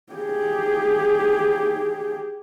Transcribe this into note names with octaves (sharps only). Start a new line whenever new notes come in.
G4 G#4